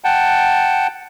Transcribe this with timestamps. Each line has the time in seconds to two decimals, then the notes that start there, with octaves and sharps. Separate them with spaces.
0.04 F#5 G5 A5